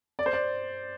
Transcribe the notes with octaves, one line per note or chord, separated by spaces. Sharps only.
D5
C5
D5